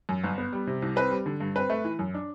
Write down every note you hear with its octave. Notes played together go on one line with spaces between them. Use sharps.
F#2
G1
B3
G3
C3
C2
C4 B4
G3
D3
G2
C4 B4
A3
E3
F#2
D4